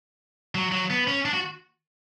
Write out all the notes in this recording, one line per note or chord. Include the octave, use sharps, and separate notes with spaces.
F#3
F#3
B3
C#4
D4
F#4